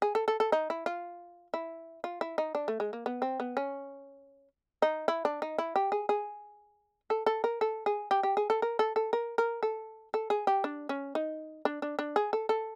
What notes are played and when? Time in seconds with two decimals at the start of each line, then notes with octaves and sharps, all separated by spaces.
0.02 G#4
0.15 A4
0.28 A4
0.40 A4
0.52 D#4
0.70 E4
0.86 F4
1.54 E4
2.04 F4
2.21 E4
2.38 D#4
2.55 D4
2.68 A3
2.80 G#3
2.93 A#3
3.06 B3
3.22 C4
3.40 B3
3.57 C#4
4.82 D#4
5.08 E4
5.25 D4
5.42 D#4
5.58 E4
5.76 G4
5.92 G#4
6.09 G#4
7.10 A4
7.26 A4
7.44 A#4
7.61 A4
7.86 G#4
8.11 G4
8.23 G4
8.37 G#4
8.50 A4
8.62 A#4
8.79 A4
8.96 A4
9.13 A#4
9.38 A#4
9.63 A4
10.14 A4
10.30 G#4
10.47 G4
10.64 D4
10.89 C#4
11.15 D#4
11.65 D4
11.82 D4
11.99 D4
12.16 G#4
12.33 A4
12.49 A4